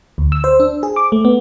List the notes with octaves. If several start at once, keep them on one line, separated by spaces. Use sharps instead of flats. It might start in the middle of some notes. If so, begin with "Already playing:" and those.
D2
E6
C5
D4
G#4
D6
A3
B3